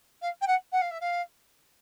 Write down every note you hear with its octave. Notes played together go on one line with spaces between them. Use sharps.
F5
G5
F#5
F#5
F5
E5
F5